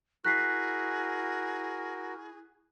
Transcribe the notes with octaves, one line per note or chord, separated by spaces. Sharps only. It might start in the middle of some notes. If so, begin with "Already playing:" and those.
E4 F#4 G#4 A#4 F#6 B6 C7